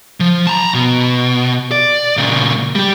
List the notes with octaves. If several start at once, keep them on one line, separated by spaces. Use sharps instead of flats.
F3
A5 A#5
B2
D5
A#2 C#3
G3 G4